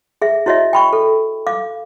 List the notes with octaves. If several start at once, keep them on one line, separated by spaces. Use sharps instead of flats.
G#4 E5
E4 F#4 C#5 D#5 E5
G5 B5 C#6
A4
F5 D6